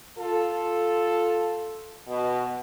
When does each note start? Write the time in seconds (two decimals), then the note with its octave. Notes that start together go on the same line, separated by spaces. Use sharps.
0.17 F4 A4
2.07 B2